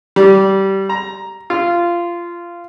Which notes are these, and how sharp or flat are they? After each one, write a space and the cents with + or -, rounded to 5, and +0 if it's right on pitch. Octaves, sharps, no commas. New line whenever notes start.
G3 -20
A#5 +10
F4 -15